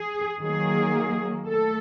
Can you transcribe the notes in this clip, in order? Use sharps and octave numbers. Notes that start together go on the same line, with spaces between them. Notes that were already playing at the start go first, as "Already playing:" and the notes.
Already playing: G#4
D#3 F#3 A#3 G#4
A3 A4